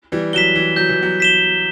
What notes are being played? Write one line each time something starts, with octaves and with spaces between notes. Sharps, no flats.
E3 G3
F#3 B6 E7 G7
E3
F#3 G6
E3
F#3
B6 E7 G7